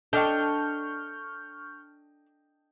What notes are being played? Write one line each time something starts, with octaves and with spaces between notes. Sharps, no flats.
D4 A4 D#5 G5 C#6 F6 G6